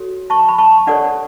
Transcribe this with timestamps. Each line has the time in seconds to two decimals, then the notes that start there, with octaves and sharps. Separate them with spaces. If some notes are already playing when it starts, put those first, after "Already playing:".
Already playing: F#4 A4 C#5
0.30 A5 C#6
0.48 B5
0.58 A5 C#6
0.87 D4 A4 C#5 D5 F#5